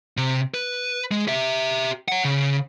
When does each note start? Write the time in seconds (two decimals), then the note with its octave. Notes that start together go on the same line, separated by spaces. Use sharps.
0.17 C3
0.54 B4
1.11 G#3
1.28 G4 E5
2.08 C#5 F#5
2.25 C#3